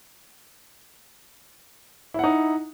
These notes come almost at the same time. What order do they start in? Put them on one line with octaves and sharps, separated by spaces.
E4 F#5 D#4